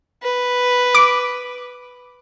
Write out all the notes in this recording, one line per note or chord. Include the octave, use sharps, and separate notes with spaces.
B4
D6